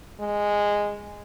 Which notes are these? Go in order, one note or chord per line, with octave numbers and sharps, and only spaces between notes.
G#3